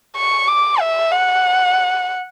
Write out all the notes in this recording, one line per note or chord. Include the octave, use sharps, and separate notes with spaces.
C#6
D6
E5
F#5